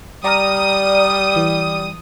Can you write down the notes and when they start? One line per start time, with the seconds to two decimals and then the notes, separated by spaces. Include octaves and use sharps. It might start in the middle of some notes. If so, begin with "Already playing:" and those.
0.24 G3 D5 A#5 D#6 F6
1.36 E3